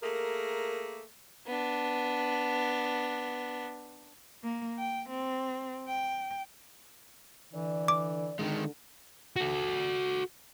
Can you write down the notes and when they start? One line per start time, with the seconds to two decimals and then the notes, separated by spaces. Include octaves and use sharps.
0.02 A3 A#3 G#4 A#4
1.47 B3 D4
4.43 A#3
4.79 G5
5.10 C4
5.88 G5
7.53 D3 E3 D5
7.88 D6
8.39 D3 D#3 G#3
9.36 F#4 A4